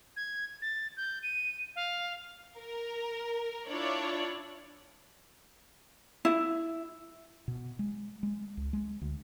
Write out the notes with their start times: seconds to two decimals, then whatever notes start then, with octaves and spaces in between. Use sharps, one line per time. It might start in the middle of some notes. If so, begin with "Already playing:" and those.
0.16 G#6
0.62 A6
0.97 G6
1.23 D#7
1.76 F5
2.58 A#4
3.69 D4 E4 F4 C#5 D5
6.25 E4
7.48 B2
7.79 G#3
8.23 G#3
8.57 C#2
8.73 G#3
9.02 D2